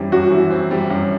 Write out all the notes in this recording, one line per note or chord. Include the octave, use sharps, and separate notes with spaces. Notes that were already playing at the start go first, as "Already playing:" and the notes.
Already playing: F#2 E3 G3 C4
F#2 F#4
E3
C4
G3
F#2